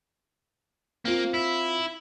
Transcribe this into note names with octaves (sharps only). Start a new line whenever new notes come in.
A#3 C4 F4
E4